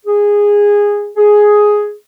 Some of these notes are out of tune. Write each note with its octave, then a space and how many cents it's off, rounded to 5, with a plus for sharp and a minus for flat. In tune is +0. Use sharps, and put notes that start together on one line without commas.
G#4 -15
G#4 +5